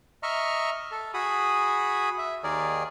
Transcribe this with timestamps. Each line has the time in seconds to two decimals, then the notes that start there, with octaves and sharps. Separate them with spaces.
0.23 D#5 E5 A#5 C#6 F6
0.91 A4
1.14 F#4 G#4 B5 D#6
2.18 E5
2.44 D#2 D#3 G#4 A#4 D5